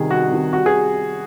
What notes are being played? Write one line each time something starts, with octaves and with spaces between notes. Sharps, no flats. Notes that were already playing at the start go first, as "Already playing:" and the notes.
Already playing: C2 C3 D#3 G#4
C2 F#4
C3 D#3
C2 F#4
G#4